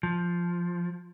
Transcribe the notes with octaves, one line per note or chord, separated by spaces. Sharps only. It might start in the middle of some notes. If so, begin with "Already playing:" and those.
F3